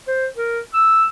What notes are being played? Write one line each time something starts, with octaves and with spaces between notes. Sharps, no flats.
C5
A#4
E6